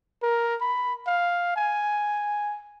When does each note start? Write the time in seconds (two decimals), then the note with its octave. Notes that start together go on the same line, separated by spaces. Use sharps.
0.23 A#4
0.61 B5
1.07 F5
1.56 G#5